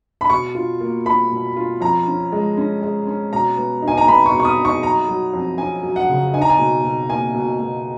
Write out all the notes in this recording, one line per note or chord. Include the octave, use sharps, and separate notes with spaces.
B5
B2 C#6
F4
A#3
A#3 B5
B2
F4
F2 A#5
C#4
G#3
C#4
G#3
C#4
B2 A#5
B3
D#4
G#5
A#5
B3 B5
C#6
B2
C#6
D#6
D#4
C#6
F#3 A#5
F#3
F2
C#4 G#5
F#3
F#5
C#3
D#4 G#5
A#5
G#5
B2
B2
A#3 G#5
B2
B2